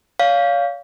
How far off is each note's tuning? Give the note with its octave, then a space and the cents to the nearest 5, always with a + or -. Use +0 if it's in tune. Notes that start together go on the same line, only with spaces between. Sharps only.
C#5 +40 F5 +0